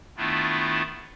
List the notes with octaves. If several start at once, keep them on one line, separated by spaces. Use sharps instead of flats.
D#3 A3 B3 D4 E4 F4